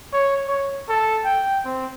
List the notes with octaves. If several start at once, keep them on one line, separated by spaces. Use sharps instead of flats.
C#5
C#5
A4
G5
C4